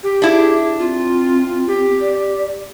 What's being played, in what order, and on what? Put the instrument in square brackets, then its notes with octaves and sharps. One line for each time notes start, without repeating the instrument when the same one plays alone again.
[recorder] G4
[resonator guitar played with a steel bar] D4 E4 [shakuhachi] G#4
[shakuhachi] C4 [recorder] F4
[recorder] G4
[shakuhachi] D5